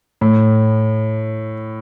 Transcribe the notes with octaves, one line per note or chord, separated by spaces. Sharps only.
A2